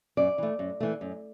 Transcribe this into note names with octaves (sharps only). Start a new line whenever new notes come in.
F#2 D5
E3 A3
F#2
E3 A3
F#2